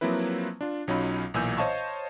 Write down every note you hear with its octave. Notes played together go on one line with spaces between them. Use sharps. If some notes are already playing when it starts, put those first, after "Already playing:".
F3 F#3 A#3 C4 E4 B4
D4 F4
B1 F#3 C#4 D#4 F4 B5
B1 A#2 E3 G#5 E6 G6
C5 C#5 D#5 F5 A5 C#6